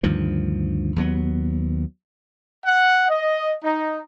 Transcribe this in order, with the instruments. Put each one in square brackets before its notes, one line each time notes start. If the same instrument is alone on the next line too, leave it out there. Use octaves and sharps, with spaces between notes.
[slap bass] D2 G2 D#3 F3
D#2 F#3 B3
[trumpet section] F#5
D#5
D#4